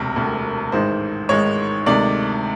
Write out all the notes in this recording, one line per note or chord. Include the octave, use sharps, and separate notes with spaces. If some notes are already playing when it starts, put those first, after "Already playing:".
Already playing: E1 D2 C3 A#4
E1 D2 C3
A1 G#2 D#3 G#3 C5
A1 G#2 D#3 G#3 C#5
D2 C3 D#3 G#3 D5